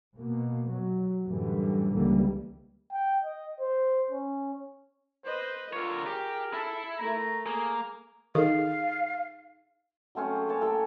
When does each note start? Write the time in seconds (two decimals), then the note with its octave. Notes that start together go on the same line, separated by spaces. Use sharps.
0.17 B2 A#3
0.68 F#3
1.24 F#2 A2 D3 E3 G3
1.93 C#2 D3 E3 G3 A#3
2.92 G5
3.24 D#5
3.60 C5
4.10 C#4
5.25 B4 C5 D#5
5.73 D3 F4 A#4 C#5
6.07 G4 G#4
6.54 E4 A4
6.99 A3 A#4 A#5
7.47 A#3 G#4
8.35 D#3 D#4 G#4 A4 F5
10.15 F#3 A3 C4 C#4
10.36 G#4
10.48 A#3 C#5 A5
10.61 A2 A4 G5 A#5